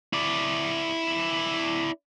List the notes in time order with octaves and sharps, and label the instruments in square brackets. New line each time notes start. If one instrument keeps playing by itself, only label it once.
[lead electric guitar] E4 D5